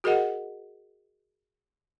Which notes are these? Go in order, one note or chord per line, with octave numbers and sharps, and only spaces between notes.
F#4 G#4 A#4 D#5 F#5